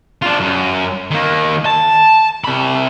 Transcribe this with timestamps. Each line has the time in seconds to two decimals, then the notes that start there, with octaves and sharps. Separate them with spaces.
0.22 D4 F4
0.40 F#2
1.11 D#3 A#3
1.66 A5
2.44 C3 B5